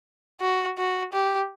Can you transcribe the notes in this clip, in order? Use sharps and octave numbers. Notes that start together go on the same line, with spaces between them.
F#4
F#4
G4